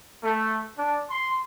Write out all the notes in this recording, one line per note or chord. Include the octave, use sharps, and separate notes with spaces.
A3
D4
C6